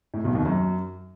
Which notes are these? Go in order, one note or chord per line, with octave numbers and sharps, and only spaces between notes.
A2
B1 B2
D#2 D#3
F#2 F#3